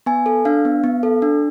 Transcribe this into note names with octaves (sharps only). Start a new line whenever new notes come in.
B3 G#5
A4
D4 F5
B3
B3
A4
D4